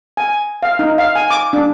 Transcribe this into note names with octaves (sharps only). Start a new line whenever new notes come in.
G#5
F5
D#4
F5
G#5
D6
D4